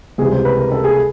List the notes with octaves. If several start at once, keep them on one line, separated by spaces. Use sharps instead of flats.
C#2 C3 E3 G3 G#4
C5
B4
A#4
A4
G#4